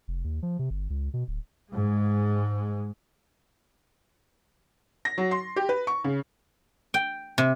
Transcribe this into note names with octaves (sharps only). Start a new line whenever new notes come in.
F1
D#2
F3
C3
G1
C#2
B2
D1
G#2 G#3
A#6
F#3
C6
G4
B4
C#6
C#3
G5
C3